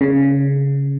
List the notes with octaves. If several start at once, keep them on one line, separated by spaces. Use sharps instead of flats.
C#3